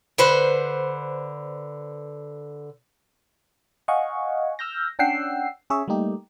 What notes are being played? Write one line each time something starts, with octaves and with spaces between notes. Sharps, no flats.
D3 B4 C5
D#5 F5 F#5 G#5 C#6
E6 F6 G6 A#6
C#4 D4 F#5 G5 E6 C7
C#4 G#4 C#5 E5
G3 A3 A#3 D#4 G4